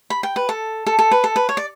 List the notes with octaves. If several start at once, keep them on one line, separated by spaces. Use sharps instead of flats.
B5
G5
B4
A4
A4
A4
B4
A4
B4
C#5
D5